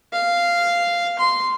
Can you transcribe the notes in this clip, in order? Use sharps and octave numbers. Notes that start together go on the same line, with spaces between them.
F5
C6